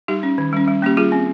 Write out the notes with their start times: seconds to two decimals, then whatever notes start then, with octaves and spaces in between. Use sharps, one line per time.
0.08 G3 D#4 G4
0.23 C#4
0.38 D#3
0.53 G3 C#4
0.68 G3
0.82 A#3 C#4 G4
0.97 G3 F4 G#4
1.12 C4